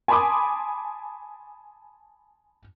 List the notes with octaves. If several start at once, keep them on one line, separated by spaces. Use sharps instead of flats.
G#5 A5 B5 C6 D6 D#6